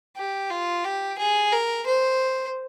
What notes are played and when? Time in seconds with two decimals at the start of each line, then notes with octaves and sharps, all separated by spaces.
0.17 G4
0.50 F4
0.84 G4
1.18 G#4
1.52 A#4
1.86 C5